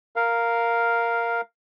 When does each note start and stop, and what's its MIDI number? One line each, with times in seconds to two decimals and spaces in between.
0.16 1.41 70
0.16 1.41 77